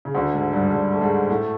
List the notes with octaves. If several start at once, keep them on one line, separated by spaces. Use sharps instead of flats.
C#3
D2 D3
G#2 G#3
G2 G3
G2 G3
A3
G#2 G#3
A2 A3